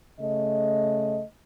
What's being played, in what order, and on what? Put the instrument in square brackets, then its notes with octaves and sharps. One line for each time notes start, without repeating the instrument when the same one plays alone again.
[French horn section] C#3 A3 D#5